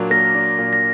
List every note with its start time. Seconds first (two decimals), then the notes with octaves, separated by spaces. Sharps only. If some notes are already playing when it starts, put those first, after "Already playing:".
Already playing: A#2 F#3 A#3 D4
0.11 A#3 A#6
0.35 D4
0.59 A#2
0.73 A#6